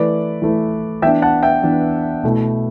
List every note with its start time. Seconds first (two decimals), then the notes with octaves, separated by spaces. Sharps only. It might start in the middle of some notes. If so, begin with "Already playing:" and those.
Already playing: E3 A3 E4 B4 D5
0.42 E3 A3 E4
1.02 E3 B3 D4 E5 G5
1.22 F#5 A5
1.43 E5 G5
1.63 E3 B3 D4
2.23 B2 A3 E4